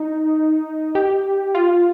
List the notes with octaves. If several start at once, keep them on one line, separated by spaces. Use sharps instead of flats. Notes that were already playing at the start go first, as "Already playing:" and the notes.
Already playing: D#4
G4
F4